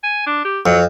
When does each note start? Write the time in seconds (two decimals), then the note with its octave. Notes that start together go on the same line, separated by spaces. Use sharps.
0.03 G#5
0.26 D4
0.45 G4
0.66 F2 F#3